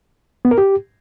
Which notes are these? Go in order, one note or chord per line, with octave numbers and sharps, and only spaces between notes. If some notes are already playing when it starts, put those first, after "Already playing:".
B3
A#4
G4